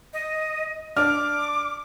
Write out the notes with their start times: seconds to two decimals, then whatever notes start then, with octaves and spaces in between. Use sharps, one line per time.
0.13 D#5
0.96 D4 D6 F6